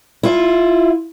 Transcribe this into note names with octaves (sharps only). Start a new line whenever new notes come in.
E4 F4